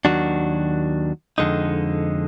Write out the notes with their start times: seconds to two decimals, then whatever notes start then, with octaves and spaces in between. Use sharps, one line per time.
0.05 D#2 D#3 F#3 D4 F#4
1.38 F2 D3 G#3 D#4